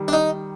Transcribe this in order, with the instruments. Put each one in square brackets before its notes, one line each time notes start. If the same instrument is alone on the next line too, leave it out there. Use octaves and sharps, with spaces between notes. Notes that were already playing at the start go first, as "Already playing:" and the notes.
Already playing: [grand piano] D#3 G3
[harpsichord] D4
D#4